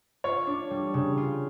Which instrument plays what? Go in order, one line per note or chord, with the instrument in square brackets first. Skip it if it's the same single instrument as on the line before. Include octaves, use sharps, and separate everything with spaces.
[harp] F4 [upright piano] C#5
[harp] D4
G3
C#3
F4